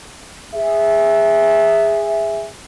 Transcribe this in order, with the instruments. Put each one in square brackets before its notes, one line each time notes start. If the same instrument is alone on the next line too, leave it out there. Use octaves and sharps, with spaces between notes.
[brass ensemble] G#4 E5